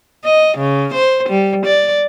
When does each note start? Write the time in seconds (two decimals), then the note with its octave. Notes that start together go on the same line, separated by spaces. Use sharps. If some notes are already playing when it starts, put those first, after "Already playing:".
0.24 D#5
0.57 C#3
0.94 C5
1.29 G3
1.66 D5